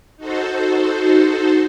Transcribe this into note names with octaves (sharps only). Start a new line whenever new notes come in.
D#4 F#4 A4 C5